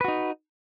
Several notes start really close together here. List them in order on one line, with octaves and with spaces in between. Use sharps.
B4 F#4 D#4